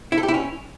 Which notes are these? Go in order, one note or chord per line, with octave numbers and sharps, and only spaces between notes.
E4
A4
G4
E4
C#4